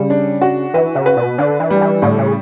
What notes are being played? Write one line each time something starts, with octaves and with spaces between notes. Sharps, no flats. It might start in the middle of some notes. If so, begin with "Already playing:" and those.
Already playing: C#3 G3
D4
F#4
E3 B4
C#3
B4
B2
D3 D4
E3
G3
E3
A2 D3
C#3